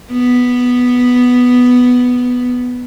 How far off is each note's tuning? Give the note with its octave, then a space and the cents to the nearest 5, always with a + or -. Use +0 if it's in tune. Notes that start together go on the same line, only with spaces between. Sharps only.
B3 +0